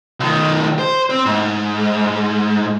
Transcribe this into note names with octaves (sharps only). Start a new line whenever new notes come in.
B1 D#3
C5
C4 C5
G#2